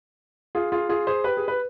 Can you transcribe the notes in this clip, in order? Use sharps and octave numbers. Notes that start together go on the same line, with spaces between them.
F4 G#4
F4 G#4
F4 G#4
G#4 C5
G4 B4
G#4
B4